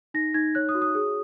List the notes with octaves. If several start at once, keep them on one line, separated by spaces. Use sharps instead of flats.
D#4 A#6
D#4 G#6
C#5 F#6
D#6
F#4
D#6
G#4